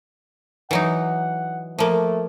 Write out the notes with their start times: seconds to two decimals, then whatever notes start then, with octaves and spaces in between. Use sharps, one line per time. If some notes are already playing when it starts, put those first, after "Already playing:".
0.71 E3 F#3 D#4 F#5
1.79 F3 A3 A#3